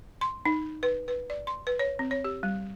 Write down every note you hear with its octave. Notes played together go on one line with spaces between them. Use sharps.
C6
D#4
B4
B4
D5
C6
B4
C#5
C4
C#5
G4
G3